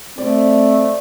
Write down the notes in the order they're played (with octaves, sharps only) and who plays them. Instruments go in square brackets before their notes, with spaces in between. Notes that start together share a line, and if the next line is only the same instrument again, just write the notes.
[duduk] A3 [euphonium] C4 [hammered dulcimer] D5